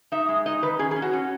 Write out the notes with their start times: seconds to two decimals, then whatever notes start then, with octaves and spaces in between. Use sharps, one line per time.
0.12 D#4 E5
0.29 G#3
0.46 D#4 D#5
0.62 D#3 B4
0.79 C#4 G#4
0.91 G#4
0.96 C#4
1.02 F#4
1.13 C#4